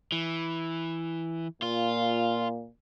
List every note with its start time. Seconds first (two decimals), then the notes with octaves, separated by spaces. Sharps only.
0.12 E3
1.62 A#2 F4